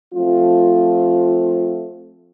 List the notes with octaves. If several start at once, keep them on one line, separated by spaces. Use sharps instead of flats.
F3 A3 C4 F4